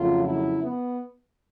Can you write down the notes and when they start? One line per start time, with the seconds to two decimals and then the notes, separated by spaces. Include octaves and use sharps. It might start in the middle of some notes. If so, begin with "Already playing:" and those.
Already playing: F2 C#3 F#3 A3 F4
0.23 E4
0.62 B3